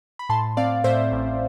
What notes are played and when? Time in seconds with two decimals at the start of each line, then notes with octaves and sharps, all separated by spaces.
0.19 B5
0.29 A2 A5 C6
0.57 C4 D5 F5
0.84 A2 C5 E5
1.12 A1